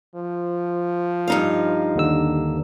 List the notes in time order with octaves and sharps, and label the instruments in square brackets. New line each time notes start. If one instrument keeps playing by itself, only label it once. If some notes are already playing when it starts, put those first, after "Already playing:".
[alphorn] F3
[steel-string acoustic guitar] G2 D#4 F5
[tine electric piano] D#2 D3 E6